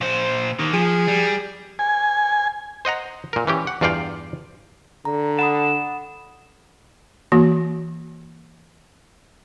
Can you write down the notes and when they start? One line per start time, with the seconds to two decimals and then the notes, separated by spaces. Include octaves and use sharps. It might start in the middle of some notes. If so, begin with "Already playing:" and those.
0.01 A#2 C5
0.59 D#3 A#3
0.73 F3 G#4
1.08 G3
1.79 G#5
2.85 C5 D#5 F#5 A#5
3.33 A#2 A#4
3.47 E3 C#4 G4
3.67 F#5
3.81 E2 G2 F4 D5 F5 G5
5.05 D3 A#5
5.39 F#5 A5 B5 D#6
7.32 E3 A#3 F#4